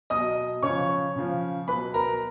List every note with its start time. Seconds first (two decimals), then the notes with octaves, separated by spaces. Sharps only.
0.10 B2 F#3 D#5 D#6
0.63 C#3 F3 C#5 C#6
1.16 C#3 F3
1.68 B2 F#3 B4 B5
1.94 A#4 A#5